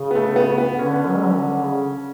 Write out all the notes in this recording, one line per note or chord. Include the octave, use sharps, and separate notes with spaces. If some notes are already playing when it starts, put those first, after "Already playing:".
Already playing: C#3
B3
A3
B3
B3
D3 C#4
F#3
G#3
F#3
D3
C#3